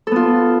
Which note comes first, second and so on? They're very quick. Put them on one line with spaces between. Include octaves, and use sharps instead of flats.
A4 B3 F4